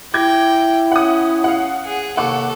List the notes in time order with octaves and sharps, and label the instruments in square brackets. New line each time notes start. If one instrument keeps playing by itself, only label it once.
[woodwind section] E4 [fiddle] G5 [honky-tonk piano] D6 G#6 A#6
[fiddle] C#4 [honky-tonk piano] F#5 D#6
[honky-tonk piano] F5 F#5
[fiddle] G#4
[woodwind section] D#2 C3 A#3 [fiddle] A4 [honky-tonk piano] F#5 C#6 D6